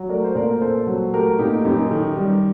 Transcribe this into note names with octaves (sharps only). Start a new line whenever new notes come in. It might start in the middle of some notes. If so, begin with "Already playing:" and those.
Already playing: F#3
A3 A#4 D5
C5
A#2 A#4 D5
A#2 A4 C5
F#3
A3 G4 A#4
A#2 D#4 G4
F#2 D#4 G4
D#3
G3